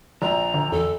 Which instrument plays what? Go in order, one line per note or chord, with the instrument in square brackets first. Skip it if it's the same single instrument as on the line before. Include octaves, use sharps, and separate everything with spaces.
[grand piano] A#1 [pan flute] A#5
[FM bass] D3
[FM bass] E2 [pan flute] A4